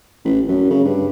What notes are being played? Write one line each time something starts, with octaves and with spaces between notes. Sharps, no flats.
A1
F#2
C#3
G2